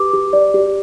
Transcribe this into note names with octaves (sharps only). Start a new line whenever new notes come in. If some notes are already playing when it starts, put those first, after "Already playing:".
Already playing: G4 B4 D6
G4
D5
G4